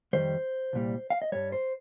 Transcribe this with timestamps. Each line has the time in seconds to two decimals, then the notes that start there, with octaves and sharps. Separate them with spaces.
0.13 F2 D#3 G3 C5
0.73 C2 A#2 G3
1.10 F5
1.22 D#5
1.32 G2 G3 C#5
1.52 C5